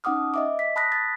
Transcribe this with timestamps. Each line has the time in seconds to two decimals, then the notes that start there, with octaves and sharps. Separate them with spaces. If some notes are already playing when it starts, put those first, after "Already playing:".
0.04 C#4 D#4 F#5 D6 D#6 F6
0.34 D#5 E5 D6
0.59 B6
0.76 A5 B5 D#6 F#6 A#6 B6
0.92 A6